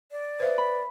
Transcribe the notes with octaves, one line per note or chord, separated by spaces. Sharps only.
D5
B4 C5 E5 F5
B5